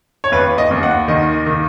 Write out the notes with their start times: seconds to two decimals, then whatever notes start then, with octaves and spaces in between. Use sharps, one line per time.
0.24 C#5
0.32 D#2 B4
0.58 D#5
0.71 D#2
0.83 F#5
1.08 D#3 D#5
1.46 D#3